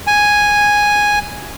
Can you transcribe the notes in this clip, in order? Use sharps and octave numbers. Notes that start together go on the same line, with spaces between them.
G#5